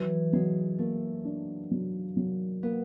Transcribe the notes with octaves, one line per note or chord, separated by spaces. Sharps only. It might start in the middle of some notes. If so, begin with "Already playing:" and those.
Already playing: E3 F#3
F#3 G#3
A3 A#3
D4
F#3
F#3
A#3 B3